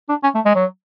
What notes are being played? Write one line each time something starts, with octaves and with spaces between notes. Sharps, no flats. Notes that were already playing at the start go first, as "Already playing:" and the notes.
D4
C#4
A3
G#3
F#3